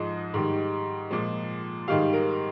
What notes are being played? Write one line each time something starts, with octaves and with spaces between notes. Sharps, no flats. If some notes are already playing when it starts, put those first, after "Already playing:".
Already playing: G#2 F3 G#3 D#5
G#2 D#3 G3
A#2 F3 G#3
G#2 D#3 G3 F5
A#4